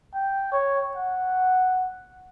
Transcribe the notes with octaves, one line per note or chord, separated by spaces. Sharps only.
G5
C#5
F#5